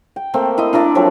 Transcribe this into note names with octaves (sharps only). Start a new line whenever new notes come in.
G5
A3 A#3 C4
E4 D#5 C6
D4 E4 A#4 D5
F3 F#3 A3 C4